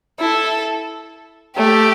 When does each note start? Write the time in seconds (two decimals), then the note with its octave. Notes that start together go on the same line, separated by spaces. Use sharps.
0.20 E4 A4
1.57 A3 G4